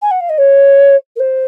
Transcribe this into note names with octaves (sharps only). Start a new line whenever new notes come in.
G#5
F#5
F5
D#5
C#5
A#4
C5